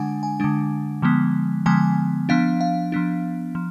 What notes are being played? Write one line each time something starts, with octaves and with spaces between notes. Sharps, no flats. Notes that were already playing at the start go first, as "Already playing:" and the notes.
Already playing: D3 G#3 D4 F#5 G#5
G#5
D3 G#3 D4
D3 F3 G#3 B3
D3 F3 G#3 B3 G#5
F3 B3 D4 F5
F5
F3 B3 D4
F3